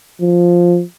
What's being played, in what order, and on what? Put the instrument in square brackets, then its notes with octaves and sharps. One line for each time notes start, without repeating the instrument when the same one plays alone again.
[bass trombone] F3